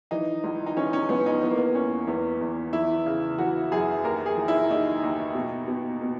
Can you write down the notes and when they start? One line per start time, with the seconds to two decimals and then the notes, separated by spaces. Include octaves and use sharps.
0.11 E3 D#4
0.44 C#2
0.66 D#4
0.77 E3 C#4
0.93 C#4
1.09 C#2 B3
1.26 D#4
1.42 E3 B3
1.50 A#3
1.57 B3
1.75 E2 C#4
2.07 E2 B3
2.41 E2
2.73 E3 E4
3.06 C#3
3.38 E3 F#4
3.72 F#2 G#4
4.04 D#2 A#4
4.26 G#4
4.37 E3
4.48 E4
4.69 D#2 D#4
5.03 D#2
5.35 B2
5.68 B2
6.02 B2